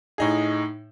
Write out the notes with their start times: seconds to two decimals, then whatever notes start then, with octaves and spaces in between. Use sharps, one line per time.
0.18 A2 D#4 G#4